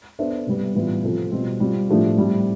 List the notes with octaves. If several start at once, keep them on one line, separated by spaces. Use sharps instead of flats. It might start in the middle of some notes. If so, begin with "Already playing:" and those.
B3 D4 A4 C5 E5
C3 G3 B3
A2 E3 G3 B3 F4
C3 F3 C4 F4 A4
B2 G3 C4 F4
G3 C4 F4
A2 F3 A3 D4 G4
A2 G3 C4